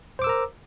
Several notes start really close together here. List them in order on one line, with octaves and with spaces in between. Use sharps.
C5 D6 E6 A#4 A#5